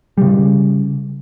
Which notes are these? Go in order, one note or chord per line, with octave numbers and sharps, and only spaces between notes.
C#3 G3